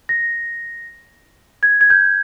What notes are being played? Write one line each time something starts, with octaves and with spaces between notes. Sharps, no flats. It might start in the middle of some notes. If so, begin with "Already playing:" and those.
A#6
G#6
G#6
G6